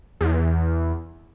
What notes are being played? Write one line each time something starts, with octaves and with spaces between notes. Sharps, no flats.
E2